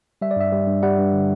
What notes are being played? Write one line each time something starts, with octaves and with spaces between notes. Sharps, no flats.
G3 E5
D5
G2 E5
G3
G2
G3 F#5
G2
D3